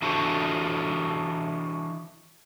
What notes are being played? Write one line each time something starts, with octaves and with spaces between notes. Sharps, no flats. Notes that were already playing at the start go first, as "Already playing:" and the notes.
E3 D4 F#4 A4 C5